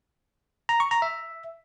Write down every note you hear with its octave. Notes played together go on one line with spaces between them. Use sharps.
A#5
C#6
A#5
E5